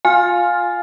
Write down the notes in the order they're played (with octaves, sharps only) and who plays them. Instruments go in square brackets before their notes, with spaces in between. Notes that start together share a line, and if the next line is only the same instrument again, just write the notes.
[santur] F4 [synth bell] G#5 F6